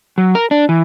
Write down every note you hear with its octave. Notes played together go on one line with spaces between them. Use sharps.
F#3
A#4
D4
E3